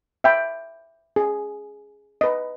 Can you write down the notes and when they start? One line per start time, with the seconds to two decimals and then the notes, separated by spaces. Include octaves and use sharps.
0.24 E5 G5 B5
1.16 G#4
2.21 B4 D#5